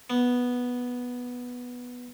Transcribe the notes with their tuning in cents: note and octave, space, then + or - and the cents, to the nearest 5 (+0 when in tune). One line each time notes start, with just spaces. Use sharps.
B3 -5